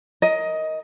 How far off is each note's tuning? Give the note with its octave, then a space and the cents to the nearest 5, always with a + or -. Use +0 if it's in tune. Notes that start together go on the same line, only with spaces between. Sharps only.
A#4 +0 D#5 +15